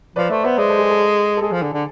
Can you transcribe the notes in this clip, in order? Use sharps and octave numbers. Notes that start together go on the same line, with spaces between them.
F3 B4 D5
A3 C5 E5
B3 C5 E5
G#3 B4 D5
A4 C5
G#4
A4
A4
G#3 G#4
F3
D3
D3